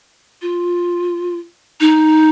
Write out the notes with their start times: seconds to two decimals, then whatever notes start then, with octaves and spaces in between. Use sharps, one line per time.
0.42 F4
1.80 D#4